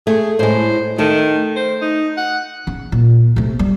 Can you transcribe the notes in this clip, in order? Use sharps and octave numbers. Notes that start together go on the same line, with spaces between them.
A3 G#4
A2 G#3 C5
D#3 A3 A4
C5
D#4
F#5
C#3
A#2
C3 A3
G3